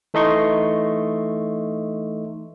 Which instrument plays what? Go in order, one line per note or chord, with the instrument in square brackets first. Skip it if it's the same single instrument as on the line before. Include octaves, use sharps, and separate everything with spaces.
[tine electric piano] E3 A3 D#4 D#5 C6 C#6